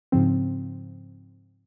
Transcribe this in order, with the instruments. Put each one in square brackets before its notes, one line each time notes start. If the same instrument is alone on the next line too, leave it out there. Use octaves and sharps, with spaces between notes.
[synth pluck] G#2 C#3 F3 C4